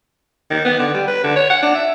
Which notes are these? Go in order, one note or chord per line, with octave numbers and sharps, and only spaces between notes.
D#3
B3
D3
G3
B4
D3
C#5
F#5
D4
E5